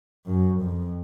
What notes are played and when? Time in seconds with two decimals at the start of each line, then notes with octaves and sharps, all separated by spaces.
0.26 F#2
0.62 F2